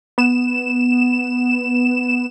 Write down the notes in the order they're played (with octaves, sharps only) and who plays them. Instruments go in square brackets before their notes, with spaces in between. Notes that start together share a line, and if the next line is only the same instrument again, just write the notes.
[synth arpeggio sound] B3 E7